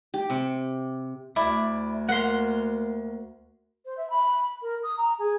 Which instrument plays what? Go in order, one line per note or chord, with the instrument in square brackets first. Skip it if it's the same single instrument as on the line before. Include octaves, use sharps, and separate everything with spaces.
[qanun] G4
C3
[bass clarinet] D2 [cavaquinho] E4 [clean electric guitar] D5
[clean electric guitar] A#3 C6 [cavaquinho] F#5
[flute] C5
E5
B5
A#4
D#6
A#5
G#4